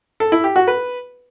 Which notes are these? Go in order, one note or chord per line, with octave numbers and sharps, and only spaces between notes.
A4
E4
G4
F#4
B4